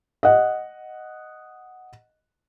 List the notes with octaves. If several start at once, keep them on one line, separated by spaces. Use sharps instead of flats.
D#5 F#5